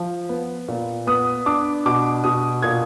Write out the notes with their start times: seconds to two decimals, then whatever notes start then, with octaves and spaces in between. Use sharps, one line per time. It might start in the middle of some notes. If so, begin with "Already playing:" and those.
Already playing: F3
0.29 B3
0.68 A#2
1.07 B3 D#6
1.46 D4 D6
1.86 B2 D6
2.24 B2 D#6
2.63 A#2 G#6